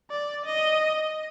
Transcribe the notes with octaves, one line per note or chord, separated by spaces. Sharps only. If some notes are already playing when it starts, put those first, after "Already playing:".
D5
D#5